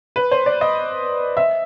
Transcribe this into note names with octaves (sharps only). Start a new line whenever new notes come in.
B4
C5
D5
D#5
E5